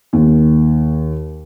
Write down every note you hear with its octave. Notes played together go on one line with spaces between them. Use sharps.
D#2